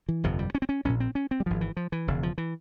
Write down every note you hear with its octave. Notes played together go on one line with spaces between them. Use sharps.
E3
G1 F2 C3 F3
G3
C#4
C4
C#4
A#1 A#2 C#4
C4
C#4
C4
G3
G#1 G2 F3
E3
F3
E3
E1 E2 C#3
F3
E3